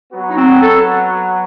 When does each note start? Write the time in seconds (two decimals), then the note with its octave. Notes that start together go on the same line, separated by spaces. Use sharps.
0.11 F#3 B3 F#4
0.30 D#4
0.37 C4
0.62 A4